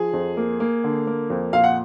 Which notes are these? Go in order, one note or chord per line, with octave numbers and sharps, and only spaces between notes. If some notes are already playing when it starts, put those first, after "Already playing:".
Already playing: F3 G#4
F2
A#3
A#3
D3
A#3
F2
A#2 F5
F#5